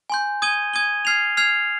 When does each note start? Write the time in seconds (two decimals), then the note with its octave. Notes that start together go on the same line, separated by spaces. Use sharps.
0.10 G#5 C6 G6
0.42 D#6 G#6 D#7 G7
0.74 D#6 G#6 D#7 G7
1.05 F6 G#6 C7 F7
1.37 F6 G#6 C7 F7